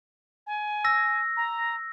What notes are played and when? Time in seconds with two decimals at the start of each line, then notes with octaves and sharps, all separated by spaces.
0.47 G#5
0.84 E6 A#6
1.37 A#5